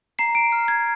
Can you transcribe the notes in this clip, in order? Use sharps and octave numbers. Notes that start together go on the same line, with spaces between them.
A#5 C7
D7
F6
G#6